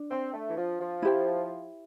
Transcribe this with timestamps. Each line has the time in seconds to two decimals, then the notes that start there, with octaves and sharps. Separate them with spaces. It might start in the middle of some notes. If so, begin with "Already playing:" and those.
Already playing: D4
0.11 C4
0.34 A3
0.49 E3
0.57 F3
0.81 F3
1.02 E4 G4 C5 G5